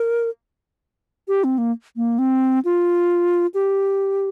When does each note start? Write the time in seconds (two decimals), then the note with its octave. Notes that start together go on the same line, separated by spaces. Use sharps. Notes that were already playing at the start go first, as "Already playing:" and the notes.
Already playing: A#4
1.28 G4
1.44 C4
1.58 A#3
1.97 A#3
2.19 C4
2.65 F4
3.54 G4